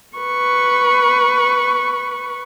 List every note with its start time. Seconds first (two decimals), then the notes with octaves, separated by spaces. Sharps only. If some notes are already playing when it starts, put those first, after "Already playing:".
0.17 B4 C#6